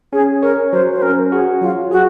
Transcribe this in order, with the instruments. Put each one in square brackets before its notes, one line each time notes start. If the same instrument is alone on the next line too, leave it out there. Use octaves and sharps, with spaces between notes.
[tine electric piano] C#4 [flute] G#4
[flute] A#4 [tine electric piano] C#5
[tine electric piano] F#3 [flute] C5
[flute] C5
[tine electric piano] C#4 [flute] A#4
[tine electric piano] F#4 [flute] G#4
[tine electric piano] F#3 [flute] F4
[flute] F#4 [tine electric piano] G#4